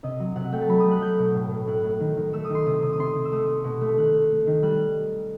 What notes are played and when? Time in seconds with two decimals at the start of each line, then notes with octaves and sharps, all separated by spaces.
0.03 C3 D#5
0.20 F#3
0.36 C3 F#5
0.52 A3 G5
0.61 A5
0.69 F#3 B5
0.80 D#6
0.85 A3
0.91 F#6
1.01 F#3 G6
1.19 B2
1.35 A2
1.51 A2
1.67 A2 F#6
1.84 A2
2.00 D#3
2.17 D#3
2.33 A3 E6
2.45 D#3 D#6
2.55 C6
2.66 C3 D#6
2.82 C3 D#6
2.93 D#6
2.99 C3 C6
3.15 C3
3.25 E6
3.32 A3 D#6
3.48 A3
3.64 B2
3.81 A3
3.97 D#3 F#6
4.14 A3
4.31 A3
4.47 D#3
4.63 G3 F#6